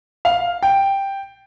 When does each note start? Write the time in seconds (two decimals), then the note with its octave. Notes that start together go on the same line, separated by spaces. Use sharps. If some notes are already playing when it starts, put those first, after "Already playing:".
0.25 F5
0.63 G5